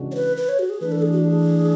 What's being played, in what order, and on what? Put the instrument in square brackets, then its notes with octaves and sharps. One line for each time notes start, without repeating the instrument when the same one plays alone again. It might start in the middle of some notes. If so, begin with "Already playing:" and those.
Already playing: [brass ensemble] C#3 E3 G#3 D4 F#4
[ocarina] C#5
B4
B4
C#5
F#4
G#4
[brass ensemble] E3 A3 D4 [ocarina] B4
[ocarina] A4
G#4
F#4
G#4